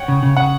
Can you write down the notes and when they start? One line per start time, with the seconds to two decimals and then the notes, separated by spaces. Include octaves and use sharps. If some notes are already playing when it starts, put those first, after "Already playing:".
Already playing: C#5 F#5 G5
0.08 C#3
0.23 C#3
0.37 C#3 F#5